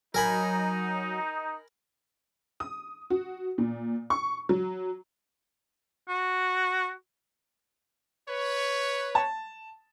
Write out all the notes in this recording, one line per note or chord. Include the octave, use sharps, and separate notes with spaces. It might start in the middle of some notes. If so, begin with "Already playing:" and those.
F#3 D#4 A#4 G#5 B5
D#6
F#4
A#2
C#6
F#3
F#4
B4 C#5
A5